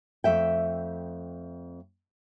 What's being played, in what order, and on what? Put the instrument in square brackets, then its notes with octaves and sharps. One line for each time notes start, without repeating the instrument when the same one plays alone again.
[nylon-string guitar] F2 A3 E5 G5